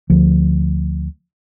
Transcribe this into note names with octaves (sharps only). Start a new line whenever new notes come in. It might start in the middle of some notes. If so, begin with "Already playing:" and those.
D2 F3